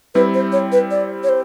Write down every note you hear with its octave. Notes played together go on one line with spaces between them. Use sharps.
G3 C4 E4 B4
C5
C#5
B4
D5
C#5
C5